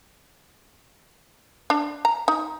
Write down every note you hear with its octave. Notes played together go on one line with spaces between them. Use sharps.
D4
A#5
D#4